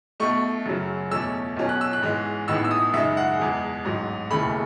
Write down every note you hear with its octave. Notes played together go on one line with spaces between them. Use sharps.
B1 B2 A3 C#6
F#2 C#3 F#3
E2 B2 A3 C#4 E6
B1 B2 F#3 C#4
F#6
E6
F#6
G#2 E3 G#3 C#4
A1 A2 E3 B3 D#4 E6
E6
D#6
F#2 C#3 G#3 D#4 E5
F#5
E2 B2 G#3
A1 G#2 F#3
E1 D#2 C#3 E3 A3 B5